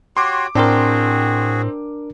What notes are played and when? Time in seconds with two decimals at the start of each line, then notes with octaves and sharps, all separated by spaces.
0.17 F#4 G4 C#5 C6 D6
0.55 A2 C4 D4 F#4 G#4 A#4 G5 C6